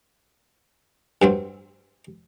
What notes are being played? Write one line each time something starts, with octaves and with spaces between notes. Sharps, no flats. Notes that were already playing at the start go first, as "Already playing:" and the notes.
G2 F#3 C4